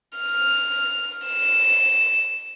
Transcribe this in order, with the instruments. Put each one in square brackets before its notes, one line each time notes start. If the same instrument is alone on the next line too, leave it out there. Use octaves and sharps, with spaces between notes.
[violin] F6
E7